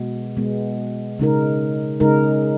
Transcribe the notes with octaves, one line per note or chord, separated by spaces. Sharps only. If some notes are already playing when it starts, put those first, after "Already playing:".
Already playing: B2 G#3 B3
B2 G#3 B3
C#3 G#3 D#4 A#4
C#3 G#3 D#4 A#4